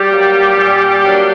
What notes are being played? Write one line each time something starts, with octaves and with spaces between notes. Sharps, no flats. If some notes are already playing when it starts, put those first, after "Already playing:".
Already playing: G3 G4
F#3 A#3
A#2
F#3 A#3 D4